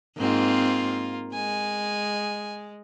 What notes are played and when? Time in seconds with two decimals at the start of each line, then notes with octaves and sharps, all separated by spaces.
0.18 G#2 A#3 C4 F4
1.34 G#3 G#5